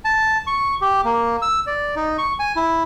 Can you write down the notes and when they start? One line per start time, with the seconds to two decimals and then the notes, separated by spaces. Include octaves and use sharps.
0.05 A5
0.47 C#6
0.81 G4
1.05 A#3
1.42 E6
1.67 D5
1.96 D#4
2.18 C#6
2.39 G#5
2.56 E4